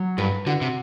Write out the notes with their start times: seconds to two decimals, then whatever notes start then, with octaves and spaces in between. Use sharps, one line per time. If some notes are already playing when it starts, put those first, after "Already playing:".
Already playing: F#3
0.18 G2 B4
0.46 D3 F#4
0.61 C3